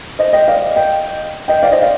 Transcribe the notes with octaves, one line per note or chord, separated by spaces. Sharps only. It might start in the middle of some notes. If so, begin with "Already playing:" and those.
C5 D#5
D#5 G5
D5 F5
D#5 G5
D#5 G5
D5 F5
C5 D#5
D5 F5